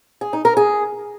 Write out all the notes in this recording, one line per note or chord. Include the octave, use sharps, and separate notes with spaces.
G#4
D#4
A#4
G#4